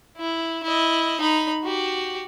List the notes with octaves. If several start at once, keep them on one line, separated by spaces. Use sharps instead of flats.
E4
E4 D#5
D#4 B5
F#4 G4